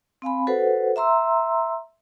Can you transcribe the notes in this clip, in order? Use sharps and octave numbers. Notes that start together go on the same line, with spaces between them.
C4 F5 G#5 B5
F#4 A4 B4 C5 F#5
E5 A#5 C6 E6